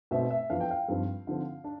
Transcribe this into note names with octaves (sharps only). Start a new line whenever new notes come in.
B2 A3 C4 E5
E5
F2 E3 B3 D4 F5
G5
F5
G2 F3 C4
D3 F3 C4
D4